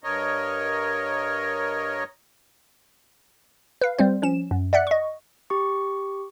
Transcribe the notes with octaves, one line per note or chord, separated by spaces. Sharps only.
G2 A#4 C#5 D#5
B4 F5
G3 C4 C5
F3 C#4 E7
F#2
D5 E5 F#5 F#6
D#5 C#6
G4 C#6